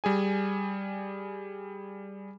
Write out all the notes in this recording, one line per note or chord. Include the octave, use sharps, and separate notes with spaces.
G3 G#4 G#5